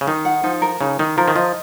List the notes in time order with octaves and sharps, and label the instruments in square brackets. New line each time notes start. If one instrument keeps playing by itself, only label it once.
[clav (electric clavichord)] C#3
[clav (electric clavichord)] D#3 [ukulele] D#4
[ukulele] F#5
[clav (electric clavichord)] F3 [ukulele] D#4
[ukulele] A#4
[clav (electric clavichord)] C#3 [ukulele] D#4
[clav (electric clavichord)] D#3 [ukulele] D#4
[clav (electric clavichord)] F3 [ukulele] A#4
[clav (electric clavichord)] D#3
[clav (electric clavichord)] F3 [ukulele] D#5